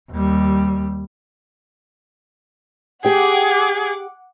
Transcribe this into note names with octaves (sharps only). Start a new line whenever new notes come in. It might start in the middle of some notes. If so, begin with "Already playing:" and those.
D#2 G3
G4 G#4 F#5 G5 D6